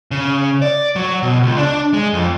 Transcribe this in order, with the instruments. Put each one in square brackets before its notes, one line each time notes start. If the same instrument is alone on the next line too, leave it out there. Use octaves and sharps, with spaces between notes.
[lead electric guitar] C#3
D5
F#3
B2
C#2
D4
G#3
F2